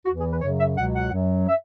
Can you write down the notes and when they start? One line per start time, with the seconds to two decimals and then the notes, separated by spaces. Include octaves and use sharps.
0.05 E2 E3 F#4
0.17 G#4
0.30 B4
0.41 F#2 C#3 F#3 C#5
0.59 E5
0.77 C#2 B2 F#3 F#5
0.94 F#5
1.12 F#2 F#3
1.48 E5